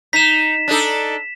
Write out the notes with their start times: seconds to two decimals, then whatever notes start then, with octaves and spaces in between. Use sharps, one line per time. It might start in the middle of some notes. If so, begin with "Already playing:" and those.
0.13 D#4 B6 E7
0.68 D4 D#4 A4